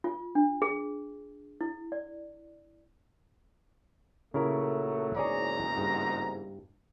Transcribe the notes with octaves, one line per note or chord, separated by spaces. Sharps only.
F4
D4
G#4
E4
D5
A#2 C#3 F#3 A3 E4 A#4
F#1 E2 G#2 G#4 C#5 D5 A#5
G2